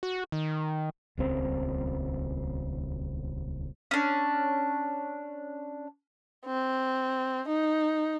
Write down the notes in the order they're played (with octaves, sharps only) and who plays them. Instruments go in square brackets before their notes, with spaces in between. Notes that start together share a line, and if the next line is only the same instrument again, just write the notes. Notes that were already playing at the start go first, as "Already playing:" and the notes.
[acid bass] F#4
D#3
[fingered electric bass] D#1 C#2 C4
[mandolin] C#4 D4
[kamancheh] C4
D#4